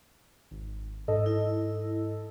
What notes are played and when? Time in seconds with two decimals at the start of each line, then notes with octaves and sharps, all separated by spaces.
0.51 G#1
1.08 G#2 A4 D#5
1.26 E4